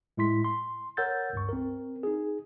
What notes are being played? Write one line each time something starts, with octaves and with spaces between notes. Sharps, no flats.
A2 G#3 E4 C6 B6
C6
A#4 C#5 F#5 E6 G6 A6
C#2 G2 C#6
C4 A#4
D#4 G#4